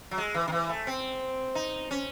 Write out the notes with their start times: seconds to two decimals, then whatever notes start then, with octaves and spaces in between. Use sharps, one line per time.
0.11 F#3
0.18 G#3
0.34 E3
0.48 D#3
0.52 E3
0.69 A3
0.87 C4
1.55 D#4
1.91 C#4